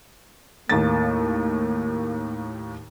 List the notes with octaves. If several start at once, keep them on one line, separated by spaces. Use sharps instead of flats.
D#2 A2 A#3 A6